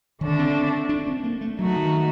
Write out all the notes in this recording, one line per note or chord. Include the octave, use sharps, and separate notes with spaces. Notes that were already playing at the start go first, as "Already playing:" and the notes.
D3 D#3 A3 D4
C4
D4
C4
A#3
A3
F#3 A3 D#4 F#4
D#3